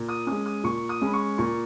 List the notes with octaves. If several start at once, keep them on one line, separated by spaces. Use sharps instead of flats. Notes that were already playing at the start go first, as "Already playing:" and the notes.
Already playing: A#2
D#6
G#3 C#4 D#6
D#6
A#2 C#6
D#6
G#3 C#4 B5
C#6
A#2 C#6